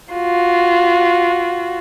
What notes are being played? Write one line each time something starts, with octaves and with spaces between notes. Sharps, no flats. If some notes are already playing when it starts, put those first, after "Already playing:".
F4 F#4